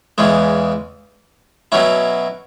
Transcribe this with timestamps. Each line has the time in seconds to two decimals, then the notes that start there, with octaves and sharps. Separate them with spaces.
0.18 E2 C#3 E3 G#3 C#4
1.72 B2 F#3 C#4 E4